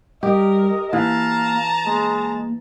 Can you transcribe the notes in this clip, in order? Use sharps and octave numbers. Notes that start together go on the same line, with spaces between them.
G3 G4 A#4 D#5
E3 A#3 F5 A5 A#5
G#3 A#3